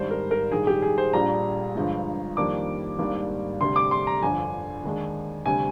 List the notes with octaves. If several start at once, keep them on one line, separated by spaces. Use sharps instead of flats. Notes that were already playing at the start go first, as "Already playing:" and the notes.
Already playing: G#1 G#2 G3 D4 C5
A#4
A#4
A#1 G#2 D#3 G3 G#4
G4
G#4
C5
A#1 A#2 G3 D4 A#5
G1 G2 F3 G#3
F2 D#3 G3 A#3 D4 D6
G#1 G#2 G3 A#3 D4
D2 C3 G3 C6
D6
C6
A#5
G1 F2 D3 G#5
D#2 D#3 G#3 D4
D2 C3 G3 G#5